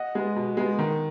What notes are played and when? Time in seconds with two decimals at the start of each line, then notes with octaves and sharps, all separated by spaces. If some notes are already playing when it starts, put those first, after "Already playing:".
Already playing: D#5 F#5
0.15 G#3 B3
0.36 B2
0.57 G#3 B3
0.79 D#3